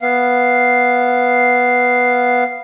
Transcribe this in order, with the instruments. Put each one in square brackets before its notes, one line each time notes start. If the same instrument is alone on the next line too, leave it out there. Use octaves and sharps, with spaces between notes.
[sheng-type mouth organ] B3 F5